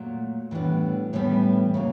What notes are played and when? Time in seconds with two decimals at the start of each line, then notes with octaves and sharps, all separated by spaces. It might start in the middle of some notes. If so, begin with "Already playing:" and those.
Already playing: A#2 F#3 A3
0.51 A2 E3 G3 B3 D4
1.13 A2 E3 G3 B3 D4
1.74 C#3 F#3 A#3